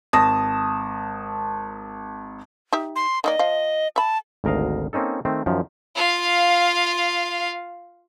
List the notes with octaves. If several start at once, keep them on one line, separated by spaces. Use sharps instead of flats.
G#1 A5 D#6 A#6
D#4 G4 E5
C6
D#3 A#3 D5 D#5
F3 F5
E5 A5 B5
G#1 D2 A#4 D#5 F5
A#3 C4 C#4 D#4 A4
D#3 A3 C4
F#2 D#3 F3
F4 F5